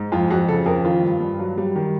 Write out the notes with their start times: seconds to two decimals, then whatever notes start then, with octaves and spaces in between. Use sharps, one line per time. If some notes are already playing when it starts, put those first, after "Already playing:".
Already playing: G#2
0.12 F2 F4
0.30 F2 F#4
0.48 C#3 A4
0.66 F2 A#4
0.84 D#3 F4
1.03 G2
1.20 G2
1.39 F#3
1.58 G3
1.76 D#3